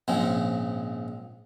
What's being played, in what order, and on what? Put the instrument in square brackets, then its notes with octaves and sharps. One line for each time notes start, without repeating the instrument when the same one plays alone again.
[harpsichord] A#1 G#2 C#3 G#3 C4